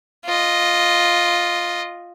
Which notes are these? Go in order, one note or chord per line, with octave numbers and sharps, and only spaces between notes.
F4 D#5